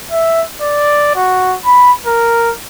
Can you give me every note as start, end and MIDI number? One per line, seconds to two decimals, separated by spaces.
0.11 0.42 76
0.62 1.13 74
1.16 1.56 66
1.65 1.92 83
2.06 2.51 70